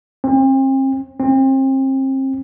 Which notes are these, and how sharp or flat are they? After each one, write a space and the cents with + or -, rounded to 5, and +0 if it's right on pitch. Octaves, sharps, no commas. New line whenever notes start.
C4 +40
C4 +35